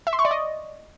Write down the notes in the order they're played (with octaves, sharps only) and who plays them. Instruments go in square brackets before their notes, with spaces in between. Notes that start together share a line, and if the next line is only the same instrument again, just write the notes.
[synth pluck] E5
C6
C#6
D5
D#5